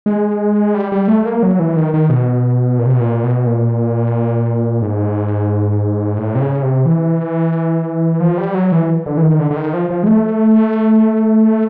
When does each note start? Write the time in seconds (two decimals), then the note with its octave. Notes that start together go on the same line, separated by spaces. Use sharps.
0.06 G#3
0.74 G3
0.92 G3
1.08 A3
1.25 A#3
1.43 F#3
1.59 E3
1.76 D#3
1.94 D#3
2.09 B2
2.79 A#2
2.86 C3
2.92 B2
3.00 A#2
3.23 B2
3.46 A#2
4.82 G#2
6.18 A2
6.35 C3
6.41 C#3
6.62 C3
6.86 E3
8.20 F3
8.38 G3
8.55 F#3
8.72 E3
9.06 D3
9.17 E3
9.23 D#3
9.39 D3
9.51 D3
9.56 D#3
9.74 F3
9.90 F3
10.03 G#3
10.07 A3